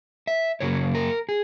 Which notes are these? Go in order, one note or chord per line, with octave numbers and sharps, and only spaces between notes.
E5
F#2 C#3 F#3 A#3 C#4 C#5
A#4
G#4